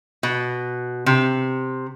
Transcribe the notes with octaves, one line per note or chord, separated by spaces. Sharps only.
B2
C3